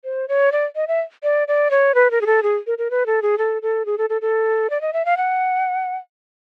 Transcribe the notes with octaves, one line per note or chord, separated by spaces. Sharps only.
C5
C#5
D5
D#5
E5
D5
D5
C#5
B4
A#4
G#4
A4
G#4
A#4
A#4
B4
A4
G#4
A4
A4
G#4
A4
A4
A4
D5
D#5
E5
F5
F#5